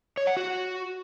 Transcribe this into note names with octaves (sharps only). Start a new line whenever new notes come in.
C#5
F#5
F#4